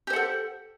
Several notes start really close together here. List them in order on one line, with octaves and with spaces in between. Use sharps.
G4 C5 F#5 A4